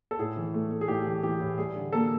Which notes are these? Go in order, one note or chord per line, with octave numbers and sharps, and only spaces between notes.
A4
A2 G#4
E3
A3
A3
G#4
A2 G4
E3
E3 G4
A2
G3 G#4
D3
A#3 A4